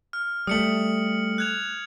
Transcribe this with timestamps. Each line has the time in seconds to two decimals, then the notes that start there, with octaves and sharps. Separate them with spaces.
0.13 F6
0.47 G3 A3 D#6 C#7 F#7
1.38 F#6 G#6 F7